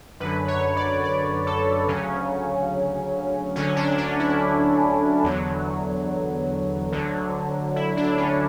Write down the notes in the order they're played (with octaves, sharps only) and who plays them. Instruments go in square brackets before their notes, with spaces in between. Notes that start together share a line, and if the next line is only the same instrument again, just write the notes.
[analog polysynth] F#2 D3 F#3 B4
C#5
D5
D5
A4
D2 C#3 F#3 C#4
D2 D3 F#3 C#4
D4
C#4
E4
E2 D3 F#3
D2 D3 F#3
E4
D4
C#4